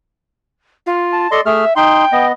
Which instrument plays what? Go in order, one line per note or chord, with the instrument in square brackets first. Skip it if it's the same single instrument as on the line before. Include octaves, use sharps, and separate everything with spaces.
[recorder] F4
[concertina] A5
[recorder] A4 [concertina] D5 D#5 C6
[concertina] A3 G#4 F6 [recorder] E5
[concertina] D#4 C6 [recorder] G5
[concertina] B3 D#5